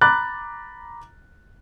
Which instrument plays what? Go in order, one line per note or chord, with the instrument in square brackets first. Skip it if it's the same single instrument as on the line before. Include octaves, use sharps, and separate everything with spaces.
[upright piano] A#5 B5 D6 F#6 A6